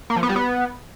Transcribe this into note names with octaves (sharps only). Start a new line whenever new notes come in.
A#3
F3
B3
G3
B3